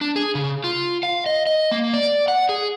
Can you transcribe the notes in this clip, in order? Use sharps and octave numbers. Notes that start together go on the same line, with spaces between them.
D4
G#4
C#3
F4
F5
D#5
D#5
A#3
D5
F#5
G#4